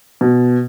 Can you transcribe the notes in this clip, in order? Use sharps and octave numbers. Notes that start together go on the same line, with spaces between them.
B2